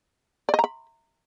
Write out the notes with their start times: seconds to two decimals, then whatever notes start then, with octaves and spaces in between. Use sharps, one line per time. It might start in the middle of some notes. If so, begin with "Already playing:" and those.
0.49 D5
0.54 D#5
0.59 A#5
0.64 B5